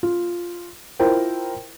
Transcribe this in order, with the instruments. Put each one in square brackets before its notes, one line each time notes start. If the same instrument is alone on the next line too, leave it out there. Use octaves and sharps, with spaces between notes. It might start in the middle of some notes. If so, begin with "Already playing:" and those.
[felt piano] F4
E4 F4 A#4 C5 G5